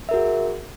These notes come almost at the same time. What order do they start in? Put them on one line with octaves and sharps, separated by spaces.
E5 A#4 F#4 G#4